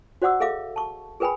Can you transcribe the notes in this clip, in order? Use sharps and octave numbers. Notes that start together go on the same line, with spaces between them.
F#4 C5 D5 F#5 D6 E6
G#4 A4 E5 F5 D6
A5 C#6
G#4 A#4 B4 G5 G#5 B5